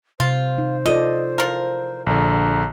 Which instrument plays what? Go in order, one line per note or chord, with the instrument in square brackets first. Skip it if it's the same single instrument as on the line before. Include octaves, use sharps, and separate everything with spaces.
[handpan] C3 [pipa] F4 [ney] C5
[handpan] D#4
[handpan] F4 A4 D5 [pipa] D#5
[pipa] F3 A#4 [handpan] E4
[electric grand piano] A#1 D3 [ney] A#5